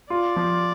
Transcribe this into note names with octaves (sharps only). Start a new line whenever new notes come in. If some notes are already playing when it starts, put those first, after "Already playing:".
F4 D5
F3